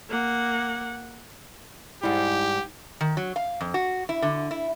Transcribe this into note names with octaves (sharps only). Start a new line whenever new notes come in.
A#3 F#5
G#2 G3 E4 G4
D#3
F#3
F5
F2
F#4
E4
D3
E4